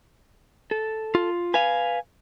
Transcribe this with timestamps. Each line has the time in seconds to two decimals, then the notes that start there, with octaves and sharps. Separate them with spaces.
0.71 A4
1.15 F4
1.54 B4 F5 G#5